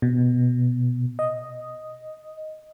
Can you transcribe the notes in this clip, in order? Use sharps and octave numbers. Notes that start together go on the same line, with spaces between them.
B2
D#5